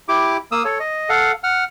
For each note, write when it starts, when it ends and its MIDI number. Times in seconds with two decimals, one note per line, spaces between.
0.09 0.37 64
0.09 0.37 67
0.09 0.37 86
0.52 0.63 58
0.52 0.63 87
0.52 0.63 88
0.65 0.78 69
0.65 0.78 73
0.80 1.09 75
1.09 1.32 69
1.09 1.32 77
1.09 1.32 78
1.43 1.64 78
1.43 1.64 89